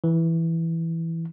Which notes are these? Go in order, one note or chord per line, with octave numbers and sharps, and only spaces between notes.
E3